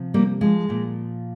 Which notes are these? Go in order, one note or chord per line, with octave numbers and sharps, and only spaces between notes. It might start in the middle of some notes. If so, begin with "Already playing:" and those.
Already playing: C3 F3
G3 A#3
F3 G#3
A#2 F3